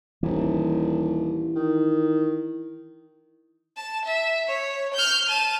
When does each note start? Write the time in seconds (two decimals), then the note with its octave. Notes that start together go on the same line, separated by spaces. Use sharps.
0.23 D#1 E3
1.56 D#3
3.77 A5
4.05 E5
4.47 C#5
4.94 F6 G6
5.29 A5 D#7